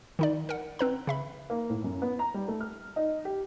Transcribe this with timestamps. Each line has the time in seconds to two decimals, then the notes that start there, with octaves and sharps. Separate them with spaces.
0.19 D#3 D#4 D5
0.49 A#4 F#5
0.79 C4 B4 A#5
1.07 C#3 E5 B5
1.50 A#3
1.70 A2
1.84 F#2
2.02 B3
2.19 A#5
2.34 G3
2.48 A3
2.61 F6
2.96 D#4
3.25 G4